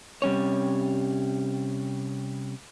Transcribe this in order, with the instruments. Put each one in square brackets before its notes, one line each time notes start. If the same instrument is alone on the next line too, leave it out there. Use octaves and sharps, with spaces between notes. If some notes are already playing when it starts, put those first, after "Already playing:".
[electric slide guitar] C3 G3 C#4 C#5